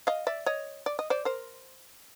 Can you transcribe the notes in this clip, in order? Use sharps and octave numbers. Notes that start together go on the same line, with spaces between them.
D#5 F5
D5 E5
C#5 D#5
D5
D#5
C5 D5
A#4 C5